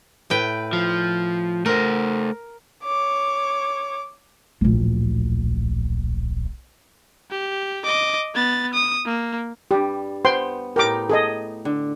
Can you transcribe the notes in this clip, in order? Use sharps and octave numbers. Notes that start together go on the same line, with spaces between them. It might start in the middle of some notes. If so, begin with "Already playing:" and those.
A2 B4 G5
F3
A3 A#4 C5
C#5 D6
D1 A#1
G4
D#5 D6
B3 A6
D#6
A#3
G2 G3 G4
B3 C5 G5 C6
A2 D#4 G4 A#4 D6
G#4 A4 D#5
D3